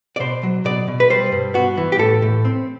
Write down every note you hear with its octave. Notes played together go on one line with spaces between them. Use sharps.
D5
B2 C5
F#3
B2 D5
B2
B4
G3 C5
G2
B3 F#4
E3
G4
A2 A4
A2
C4